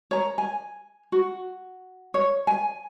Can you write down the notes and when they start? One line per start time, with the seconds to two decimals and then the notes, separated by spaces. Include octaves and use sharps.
0.11 C#5 A#5
0.38 G#5
1.12 F#4
2.14 C#5
2.47 G#5